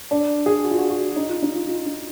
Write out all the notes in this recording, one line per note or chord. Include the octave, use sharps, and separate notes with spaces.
D4
G#4
F#4
F4
F#4
F#4
D#4
F4
D#4
F4
F4
D#4